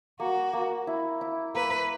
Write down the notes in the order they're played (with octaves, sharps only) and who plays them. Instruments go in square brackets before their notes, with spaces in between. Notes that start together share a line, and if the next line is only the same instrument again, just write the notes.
[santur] A#3 [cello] F#4
[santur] A#3
E4
E4
[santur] A#3 [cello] B4